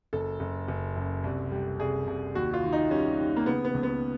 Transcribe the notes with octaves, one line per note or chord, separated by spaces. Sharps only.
F#1 A4
F#1
F#1
F#2
C2
G3
C2 G#4
C2
D#2 F#4
F4
D#3
D#4
G3 C#4
D#3
A#3
C#3 B3
B3
C#2
B3